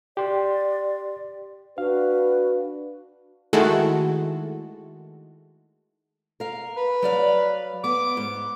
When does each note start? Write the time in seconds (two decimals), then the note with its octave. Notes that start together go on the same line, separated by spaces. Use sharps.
0.17 G4 D5 C6
1.78 D4 F#4 B4 F5
3.53 D#3 G#3 A3 E4 F#4 A4
6.40 A#4 F5
6.77 B4
7.02 F#3 D5 F5
7.84 B3 D6
8.17 G#2